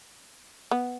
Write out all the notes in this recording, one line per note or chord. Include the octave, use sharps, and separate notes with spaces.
B3